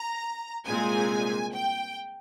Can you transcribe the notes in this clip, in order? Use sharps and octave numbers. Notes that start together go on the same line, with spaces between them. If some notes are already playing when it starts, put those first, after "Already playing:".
Already playing: A#5
C2 A#2 G#3 C4 G#5
G5